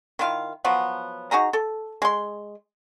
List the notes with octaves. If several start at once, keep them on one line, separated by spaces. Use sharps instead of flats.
D#3 E4 F4 F5
F3 F#3 B3
D#4 F#4 G#4 A#5
A4
G#3 C6